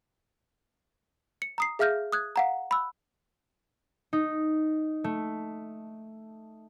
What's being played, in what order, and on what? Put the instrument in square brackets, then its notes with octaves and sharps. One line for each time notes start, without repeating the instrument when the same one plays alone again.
[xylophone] C#7
A#5 D#6 C7
G#4 E5 F5 F6 G6 A#6
D#6 F#6 G#6
F5 F#5 A#5
B5 E6 F#6
[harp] D#4
A3